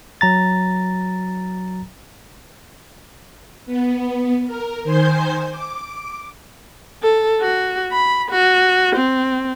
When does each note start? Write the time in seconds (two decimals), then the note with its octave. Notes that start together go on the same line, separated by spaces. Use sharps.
0.21 F#3 A#5 A6
3.66 B3
4.46 A#4
4.84 D#3 C5 G#5 C6 G6 C7
5.50 D6
7.03 A4
7.41 F#4
7.92 B5
8.31 F#4
8.96 C4